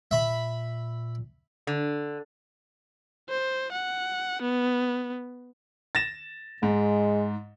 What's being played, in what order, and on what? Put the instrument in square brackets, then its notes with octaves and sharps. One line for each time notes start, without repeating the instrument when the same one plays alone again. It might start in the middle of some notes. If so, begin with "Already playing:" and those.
[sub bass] A#2 [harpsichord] E5 B5
[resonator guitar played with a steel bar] D3
[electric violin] C5
F#5
B3
[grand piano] A6 A#6 E7
[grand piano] G#2 [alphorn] G#3